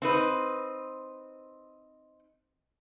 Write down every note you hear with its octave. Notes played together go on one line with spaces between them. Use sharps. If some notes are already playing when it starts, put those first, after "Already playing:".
C4 D#4 B4